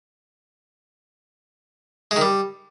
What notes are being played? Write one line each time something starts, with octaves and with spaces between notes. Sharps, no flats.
G#3
D#3
G3